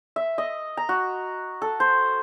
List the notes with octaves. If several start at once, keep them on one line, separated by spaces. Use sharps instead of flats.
E5
D#5
A#5
F#4
A4
C5